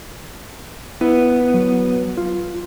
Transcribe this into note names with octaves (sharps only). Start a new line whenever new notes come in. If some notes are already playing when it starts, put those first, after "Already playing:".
B3 E4
F#3
F4